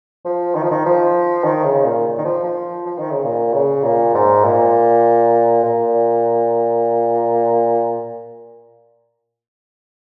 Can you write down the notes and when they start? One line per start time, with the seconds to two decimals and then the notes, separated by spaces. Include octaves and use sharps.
0.25 F3
0.55 D#3
0.63 F3
0.71 D#3
0.85 F3
1.44 D#3
1.64 C#3
1.84 A#2
2.18 D#3
2.25 F3
2.44 F3
2.86 F3
2.99 D#3
3.11 C#3
3.24 A#2
3.54 C#3
3.84 A#2
4.14 G#2
4.44 A#2
5.64 A#2